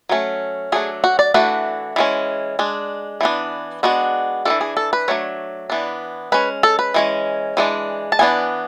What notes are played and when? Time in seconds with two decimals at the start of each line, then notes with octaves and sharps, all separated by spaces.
0.09 F#3 A3 C#4
0.72 F#3 A3 D4 G#4
1.04 F#4
1.19 D5
1.34 E3 A3 D4 F#4
1.96 E3 G#3 C#4
2.59 G#3 D4
3.21 E3 B3 D4
3.83 G#3 B3 D4 F#4
4.45 G#3 D4 A4
4.50 E3
4.61 G#4
4.77 A4
4.93 B4
5.08 F#3 A3 D4 C#5
5.70 E3 B3 D4
6.32 G#3 C#4 B4
6.63 A4
6.79 B4
6.94 E3 G#3 C#4
7.57 E3 G#3 D4
8.12 A5
8.19 E3 B3 D4 G#5